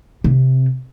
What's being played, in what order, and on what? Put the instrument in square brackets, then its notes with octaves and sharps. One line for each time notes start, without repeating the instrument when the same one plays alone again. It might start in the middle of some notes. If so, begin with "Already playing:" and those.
[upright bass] C3